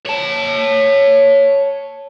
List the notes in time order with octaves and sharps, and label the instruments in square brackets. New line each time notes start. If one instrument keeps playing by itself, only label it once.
[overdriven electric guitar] C#5 A5